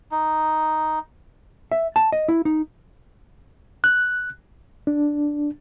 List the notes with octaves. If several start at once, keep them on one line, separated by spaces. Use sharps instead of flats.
D#4
E5
A5
D#5
E4
D#4
F#6
D4